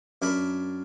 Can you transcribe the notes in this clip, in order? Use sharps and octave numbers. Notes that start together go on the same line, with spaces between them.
F#2 D4 A#4 B5